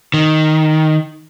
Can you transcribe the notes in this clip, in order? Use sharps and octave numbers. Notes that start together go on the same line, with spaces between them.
D#3